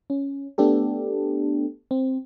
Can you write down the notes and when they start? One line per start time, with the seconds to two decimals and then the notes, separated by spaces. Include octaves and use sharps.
0.10 C#4
0.58 A3 B3 D4 G4 A4
1.91 C4